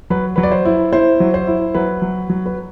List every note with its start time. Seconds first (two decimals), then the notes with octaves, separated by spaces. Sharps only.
0.10 F#3 B4
0.36 F#3 B4
0.43 D5
0.52 C5
0.65 E4
0.93 E4 C5
1.20 F#3
1.34 C5
1.47 E4
1.75 F#3 B4
2.02 F#3
2.30 F#3
2.46 B4